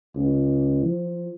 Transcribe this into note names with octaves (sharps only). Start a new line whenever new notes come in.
C#2
F3